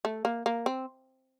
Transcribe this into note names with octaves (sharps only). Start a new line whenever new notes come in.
A3
A#3
A#3
C4